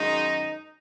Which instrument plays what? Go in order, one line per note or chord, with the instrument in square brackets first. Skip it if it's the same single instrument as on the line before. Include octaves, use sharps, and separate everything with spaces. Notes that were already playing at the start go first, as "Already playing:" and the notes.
Already playing: [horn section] F#2 D#3 G#3 D#4